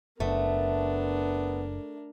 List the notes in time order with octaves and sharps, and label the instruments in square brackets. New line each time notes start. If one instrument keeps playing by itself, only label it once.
[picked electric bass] F#1 [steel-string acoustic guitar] A3 [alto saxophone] B3 [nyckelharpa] D4 A#4